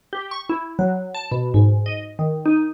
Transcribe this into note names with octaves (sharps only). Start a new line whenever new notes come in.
G4
C#6
E4
F#3
A5
B2
G#2
D#5
D#3
D#4